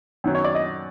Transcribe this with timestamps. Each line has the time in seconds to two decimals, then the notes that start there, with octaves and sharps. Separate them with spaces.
0.24 F#2 D#3 F#3
0.35 C#5
0.44 D5
0.55 D#5